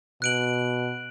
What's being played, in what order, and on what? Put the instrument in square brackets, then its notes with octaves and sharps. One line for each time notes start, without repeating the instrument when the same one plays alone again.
[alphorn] B2 [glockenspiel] F#6 D7 F#7